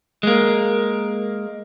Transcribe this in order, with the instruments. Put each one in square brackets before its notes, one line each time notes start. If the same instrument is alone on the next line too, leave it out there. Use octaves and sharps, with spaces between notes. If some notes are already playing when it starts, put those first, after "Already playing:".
[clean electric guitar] G#3 A#3